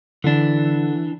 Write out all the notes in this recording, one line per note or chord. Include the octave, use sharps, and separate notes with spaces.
D3 E3 D4